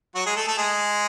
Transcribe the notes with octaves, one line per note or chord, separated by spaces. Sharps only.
F#3 F#4
G#3 G#4
A3 A4
A3 A4
G#3 G#4